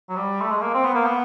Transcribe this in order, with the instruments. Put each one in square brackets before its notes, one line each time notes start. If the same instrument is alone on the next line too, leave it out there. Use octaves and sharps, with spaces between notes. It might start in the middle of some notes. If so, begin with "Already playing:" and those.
[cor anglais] F#3
G3
A3
G#3
A#3
C4
B3
A#3
B3